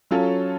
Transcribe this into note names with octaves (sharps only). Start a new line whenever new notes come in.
F#3 C#4 F4 A4